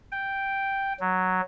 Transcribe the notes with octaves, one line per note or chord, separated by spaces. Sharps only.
G5
F#3